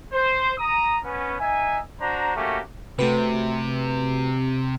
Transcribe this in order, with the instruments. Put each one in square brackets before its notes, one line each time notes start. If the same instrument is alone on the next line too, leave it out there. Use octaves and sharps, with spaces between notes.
[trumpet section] C5
A#5 D#6
B3 C#4
D#4 E5 G#5
D4 F#4 C5 A#5
A3 A#3 C#4 F#4 G4
[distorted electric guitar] C3 [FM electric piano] A3 F#4 B4